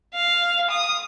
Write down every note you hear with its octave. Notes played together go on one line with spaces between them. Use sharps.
F5
D#6